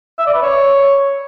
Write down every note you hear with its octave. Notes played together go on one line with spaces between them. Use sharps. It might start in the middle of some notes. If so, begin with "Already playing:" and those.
E5
D5
B4
C#5